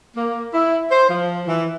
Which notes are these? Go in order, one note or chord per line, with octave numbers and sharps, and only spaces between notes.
A#3
E4
C5
F3
E3